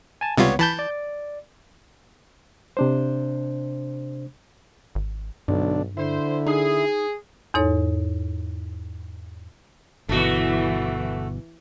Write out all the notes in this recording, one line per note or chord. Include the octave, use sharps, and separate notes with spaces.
G#5 A5
C#2 C3 G3 B3 F4 C#5
E3 A5 B5 G6
D5
C3 D4 C5
G#1
B1 G2 D3 D4
D3 E4 C5
D#4 G#4
E2 G#2 D#4 A4 C#5
G1 B2 E3 A3 F#4